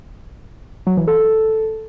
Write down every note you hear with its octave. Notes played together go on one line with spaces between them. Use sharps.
F#3
E3
A4